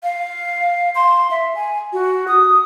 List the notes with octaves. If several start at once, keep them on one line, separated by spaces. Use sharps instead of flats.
F5
C6
E5
G#5
F#4
D#6